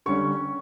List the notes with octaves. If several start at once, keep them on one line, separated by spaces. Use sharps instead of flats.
D3 G3 C#4 C#6